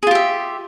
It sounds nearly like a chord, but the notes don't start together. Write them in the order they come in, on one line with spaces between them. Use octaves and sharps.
G#4 F4 G4 E5